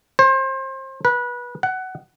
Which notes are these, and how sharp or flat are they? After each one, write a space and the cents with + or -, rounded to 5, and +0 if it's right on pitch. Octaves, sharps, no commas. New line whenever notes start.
C5 +30
B4 -25
F#5 +15